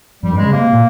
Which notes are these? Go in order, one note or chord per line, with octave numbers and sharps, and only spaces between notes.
F2 G3
G2
G#3
C#3
C3 A#3
A#2